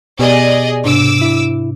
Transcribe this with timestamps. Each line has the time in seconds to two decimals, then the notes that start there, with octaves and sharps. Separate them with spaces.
0.19 B2 B3 G4 G#4 D5 D#5
0.84 G#2 C3 D4 D6 E6
1.21 E4